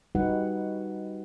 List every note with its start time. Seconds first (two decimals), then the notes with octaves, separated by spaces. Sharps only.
0.15 G3 D#4 F#4 G4 B4 F#5